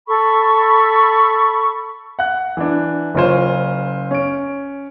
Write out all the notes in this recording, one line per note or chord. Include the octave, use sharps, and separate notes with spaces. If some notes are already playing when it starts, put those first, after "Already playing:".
A4 B5 C#6
F#5 F#6
E3 D4
F#1 C#4 F4 C5
C#4 D7